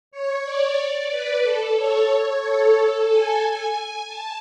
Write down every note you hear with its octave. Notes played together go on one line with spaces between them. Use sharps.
C#5
D5
B4
A4
C#5
A4
G#5
A5